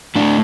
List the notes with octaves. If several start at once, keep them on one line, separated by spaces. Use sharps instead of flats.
A2 A3 D4